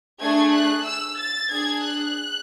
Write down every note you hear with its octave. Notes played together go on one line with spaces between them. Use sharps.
A3 D4 G#4 G#6
F#6
E6
A6
D4 G#4 G#6
F#6